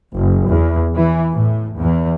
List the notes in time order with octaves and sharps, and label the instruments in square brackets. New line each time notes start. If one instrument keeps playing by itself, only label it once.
[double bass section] F#1
E2
E3
A2
E2